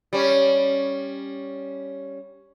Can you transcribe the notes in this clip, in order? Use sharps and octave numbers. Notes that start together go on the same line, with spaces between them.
G3 C#4